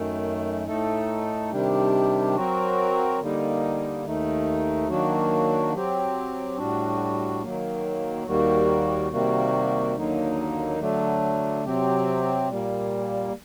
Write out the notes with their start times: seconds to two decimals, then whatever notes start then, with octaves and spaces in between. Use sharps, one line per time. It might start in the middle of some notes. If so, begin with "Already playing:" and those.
Already playing: F#2 D#3 A3
0.67 A2 A3 D#4 A4
1.51 C3 D#3 G3 D4 G4
2.35 F#3 C4 F#4 A#4
3.20 D3 G3 A#3 D#4
4.05 D#2 D#3 A3 D#4
4.89 D#3 F#3 A#3 D4 F#4
5.73 F#3 C4 G4
6.57 A2 G3 D4 F#4
7.42 D#3 F#3 A#3
8.26 D#2 D#3 G3 A#3 F#4
9.11 C3 D#3 G3 A#3 F#4
9.96 D#2 D3 F#3 A#3 D#4
10.79 D3 F#3 A3 D4
11.64 C3 F#3 C4 G4
12.49 A#2 G3 A#3